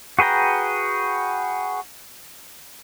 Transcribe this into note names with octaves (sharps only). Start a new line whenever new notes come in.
F#4 G#4 B4 G5 A#5